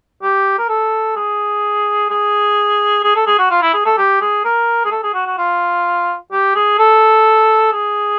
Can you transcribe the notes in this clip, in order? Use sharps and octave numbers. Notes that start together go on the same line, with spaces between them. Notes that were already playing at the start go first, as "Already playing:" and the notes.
G4
A#4
A4
G#4
G#4
G#4
A4
G#4
F#4
F4
E4
G#4
A4
G4
G#4
A#4
G#4
A4
G#4
F#4
F#4
F4
G4
G#4
A4
G#4